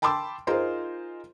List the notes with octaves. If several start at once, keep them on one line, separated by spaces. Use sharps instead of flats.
G5 A5 B5 C6 D6 E6
D#4 F4 G#4 A#4 C5 C6